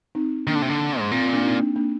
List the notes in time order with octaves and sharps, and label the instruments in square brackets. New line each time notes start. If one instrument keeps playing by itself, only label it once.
[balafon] C4 D#4
[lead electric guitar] D#3 [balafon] A#3 D4
[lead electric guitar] D3
C3
D3
G#2
[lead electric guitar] A#2 [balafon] C4
[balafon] C4
A#3 D4
C4 D#4
A#3 D4
A#3 D4